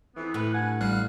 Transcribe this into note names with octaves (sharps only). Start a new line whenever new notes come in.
F2 E3 B3
A2 B4
G2 B4 F#5 G#5
A1 G3 F5 F#6